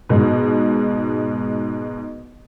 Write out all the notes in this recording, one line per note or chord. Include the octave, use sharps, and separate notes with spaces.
G#2 B2